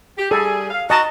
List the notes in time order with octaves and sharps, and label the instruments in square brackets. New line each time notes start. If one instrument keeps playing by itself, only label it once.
[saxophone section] G4
[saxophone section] G3 G#4 [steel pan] A4
[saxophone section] F5
[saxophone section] F#4 [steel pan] D#5 A5 [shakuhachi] A#5